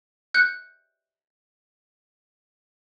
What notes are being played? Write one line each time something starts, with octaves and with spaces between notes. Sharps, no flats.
F#6 G6 C#7